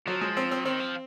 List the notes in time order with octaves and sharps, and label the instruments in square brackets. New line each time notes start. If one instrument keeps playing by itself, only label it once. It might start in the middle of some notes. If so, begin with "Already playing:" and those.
[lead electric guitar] F3 [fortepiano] F#3
[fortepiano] G#3
C4
C4
[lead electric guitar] D#3 [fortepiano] C4
[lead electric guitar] F3